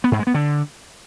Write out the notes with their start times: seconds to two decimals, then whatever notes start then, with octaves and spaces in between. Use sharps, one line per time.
0.04 B3
0.12 G#2
0.19 G#3
0.27 B3
0.34 D3